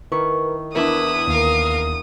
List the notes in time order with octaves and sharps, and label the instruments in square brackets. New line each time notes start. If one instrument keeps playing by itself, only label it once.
[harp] D#3 E4 C#6 [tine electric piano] A#4 B4
[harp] E2 E3 D4 [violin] E4 [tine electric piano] A#4 [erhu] D#6
[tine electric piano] D#2 [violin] A#4 F5